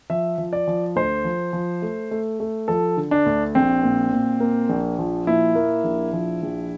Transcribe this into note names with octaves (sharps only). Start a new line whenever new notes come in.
F3 E5
F3
D5
F3
D2 C5
F3
F3
A3
A3
A3
F3 A4
D3
D4
D2
A#1 C4
A#2
A#2
A#3
A#1
F3
A#2 E4
A#3
A#1
F3
A#1